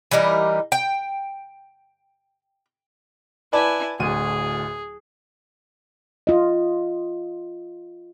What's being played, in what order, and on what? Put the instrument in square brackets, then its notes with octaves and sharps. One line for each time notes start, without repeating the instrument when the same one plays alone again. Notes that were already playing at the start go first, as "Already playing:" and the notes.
[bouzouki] E3 G3 D#4 A#4
G5
[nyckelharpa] E4 G#5 [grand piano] B4 D5 A5
[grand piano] D1 D2 D#7 [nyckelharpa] G#4
[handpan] F4 D#5